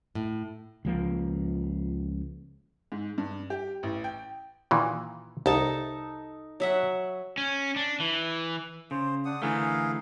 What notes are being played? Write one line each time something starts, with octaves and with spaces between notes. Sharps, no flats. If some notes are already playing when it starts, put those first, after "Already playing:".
A2
C#2 F3 A#3
G#2
G2
G4
A1
G5
A#2 D#3 E3
C2 D#4 A4 A5
F#3 E5 F#5
C#4
D4
E3
C#3 C5
D4 F#5 D#6
D3 E3 A3 G#4 A#4 F5